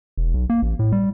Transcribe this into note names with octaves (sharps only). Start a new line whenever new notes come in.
E1
B1
A#3
A1
A2
G3